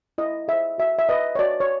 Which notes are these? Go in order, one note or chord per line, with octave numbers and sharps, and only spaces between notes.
E4 D#5
G#4 C5 E5
F#4 E5
E5
B4 D#5
C#5
F#4 D5
C#5